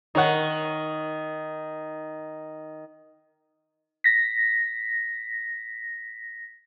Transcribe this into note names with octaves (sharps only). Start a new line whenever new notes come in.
D#3 D#4 C#5 F#5
A#6 B6